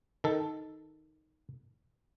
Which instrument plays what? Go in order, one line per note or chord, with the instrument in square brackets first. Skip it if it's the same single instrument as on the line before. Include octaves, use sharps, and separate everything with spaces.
[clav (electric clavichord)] D#3 A4